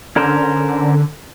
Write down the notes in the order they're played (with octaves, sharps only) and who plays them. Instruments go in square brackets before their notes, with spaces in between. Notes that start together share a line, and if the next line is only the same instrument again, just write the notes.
[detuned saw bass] D3 [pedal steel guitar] C#4 A#4 C5